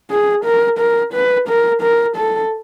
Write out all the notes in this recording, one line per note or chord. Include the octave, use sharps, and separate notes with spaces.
G#4
A#4
A#4
B4
A#4
A#4
A4